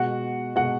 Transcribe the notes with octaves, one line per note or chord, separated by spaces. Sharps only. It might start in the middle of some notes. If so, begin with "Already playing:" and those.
Already playing: B2 G#3 F#4 F#5
B2 G#3 F#4 F#5